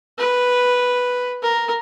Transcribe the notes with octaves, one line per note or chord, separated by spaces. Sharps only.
B4
A#4